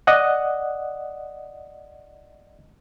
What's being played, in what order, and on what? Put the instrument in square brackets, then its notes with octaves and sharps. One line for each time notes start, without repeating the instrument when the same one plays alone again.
[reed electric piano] D5 D#5 F#5